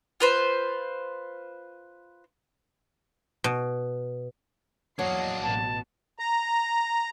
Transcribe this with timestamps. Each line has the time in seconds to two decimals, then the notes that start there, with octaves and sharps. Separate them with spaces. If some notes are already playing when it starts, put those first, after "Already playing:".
0.20 F4 B4 C5
3.44 B2
4.99 E2 F#3 A#3 D4 C#5 D#5 C7
5.43 A1 B2 A5
6.19 A#5